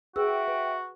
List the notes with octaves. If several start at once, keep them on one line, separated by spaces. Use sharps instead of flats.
F#4 G#4 B4 E5 G5 E6
B4